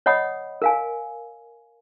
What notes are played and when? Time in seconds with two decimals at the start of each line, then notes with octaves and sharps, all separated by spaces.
0.06 C#5 D#5 F#5 B5 D#6
0.62 A#4 F5 G#5